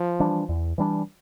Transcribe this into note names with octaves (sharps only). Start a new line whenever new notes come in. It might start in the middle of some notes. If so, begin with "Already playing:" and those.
Already playing: F3
E3 G3 D4
E2
E3 G3 D4